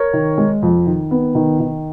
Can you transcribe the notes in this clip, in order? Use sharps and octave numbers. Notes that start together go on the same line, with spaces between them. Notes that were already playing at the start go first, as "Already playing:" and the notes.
Already playing: A#4 C#5
D#3
G#3
F2
D#3
B3
D#3
D#3